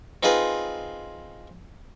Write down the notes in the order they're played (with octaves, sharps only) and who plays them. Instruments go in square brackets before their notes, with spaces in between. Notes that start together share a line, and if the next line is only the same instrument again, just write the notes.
[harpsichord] C4 D#4 F4 G#4 B4